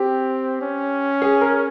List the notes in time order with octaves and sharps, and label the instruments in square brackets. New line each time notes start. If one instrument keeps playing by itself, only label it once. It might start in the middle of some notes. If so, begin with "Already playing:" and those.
Already playing: [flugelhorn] C4 [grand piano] G4
[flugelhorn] C#4
[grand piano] G#4
A#4